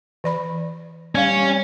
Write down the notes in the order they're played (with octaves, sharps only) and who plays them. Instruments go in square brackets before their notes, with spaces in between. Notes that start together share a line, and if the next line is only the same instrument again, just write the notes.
[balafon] E3 D5 B5
[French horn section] G3 [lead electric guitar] C#4 [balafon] D5 F5